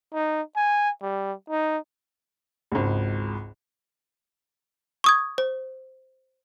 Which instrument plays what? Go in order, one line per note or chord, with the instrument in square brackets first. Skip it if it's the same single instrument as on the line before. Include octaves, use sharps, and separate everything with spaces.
[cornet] D#4
G#5
G3
D#4
[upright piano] G#1 C#2
[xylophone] C#6 D#6 G#6
C5